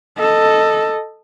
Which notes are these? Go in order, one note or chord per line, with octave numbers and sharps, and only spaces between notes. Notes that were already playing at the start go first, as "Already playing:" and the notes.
A4 D#5